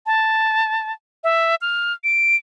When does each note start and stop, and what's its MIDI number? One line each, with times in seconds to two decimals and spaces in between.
0.06 0.92 81
1.24 1.55 76
1.61 1.93 89
2.04 2.36 98